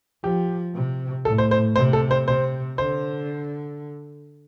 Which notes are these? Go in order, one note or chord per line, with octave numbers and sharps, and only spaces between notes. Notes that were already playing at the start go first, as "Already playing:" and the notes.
F3 G4
C3
A2 A4
C5
C5
C3 C5
A4
C5
C3 C5
D3 C5